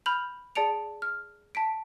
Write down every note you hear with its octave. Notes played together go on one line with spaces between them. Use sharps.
B5 F6 G6 F7 F#7
G#4 D5 A5 C#7 D7 F7
F6
A5 B6 D7